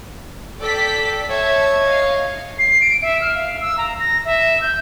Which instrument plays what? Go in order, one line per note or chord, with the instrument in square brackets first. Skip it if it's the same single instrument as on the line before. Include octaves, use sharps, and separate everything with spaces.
[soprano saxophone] A4 [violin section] D5 G5 B6
[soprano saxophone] C#5 [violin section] E5 A5
[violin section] D#5 F5
[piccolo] C7
D7
E5
F6
F5
E6
A#5
A#6
E5
G6